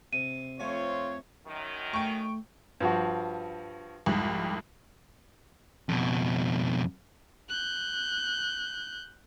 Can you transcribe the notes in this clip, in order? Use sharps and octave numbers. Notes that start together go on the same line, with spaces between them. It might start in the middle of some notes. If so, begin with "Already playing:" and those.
C3 D#7
F2 A3 C4 F4 C#5 G#5
F#2 D#3
A3 G5 C#6
G2 F3 F#4
C2 F2 G#2
F2 B2
F#6 G6